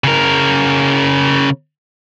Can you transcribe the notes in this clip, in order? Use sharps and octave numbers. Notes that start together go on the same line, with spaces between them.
C#3 A#4